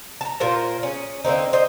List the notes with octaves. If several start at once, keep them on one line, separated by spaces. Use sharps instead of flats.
A5 A#5
A#2 F4 A#4 C5
C#4 G#4
D3 A#3 C4 D#4
C5 D#5